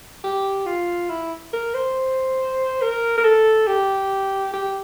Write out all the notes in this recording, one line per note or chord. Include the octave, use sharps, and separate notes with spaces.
G4
F4
E4
A#4
C5
A#4
A#4
A4
G4
G4